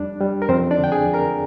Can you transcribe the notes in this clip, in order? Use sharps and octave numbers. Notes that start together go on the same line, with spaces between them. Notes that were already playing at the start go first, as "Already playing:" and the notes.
Already playing: F2 G3 D4
G3
A#4
F2 C4 C5
D4 D5
D3 G5
G#4 G#5
F2
A#4 A#5